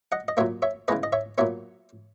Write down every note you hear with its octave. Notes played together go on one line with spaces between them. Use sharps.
D#5 F#5
D#5
A#2 F#3 A#3 C#5 E5
C#5 E5
C#3 E3 G#3 B3 B4 D#5
D#5
C#5 E5
A#2 F#3 B3 C#5 E5